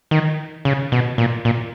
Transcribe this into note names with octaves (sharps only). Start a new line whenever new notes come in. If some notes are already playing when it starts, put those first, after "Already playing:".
D#3
C#3
B2
A#2
A#2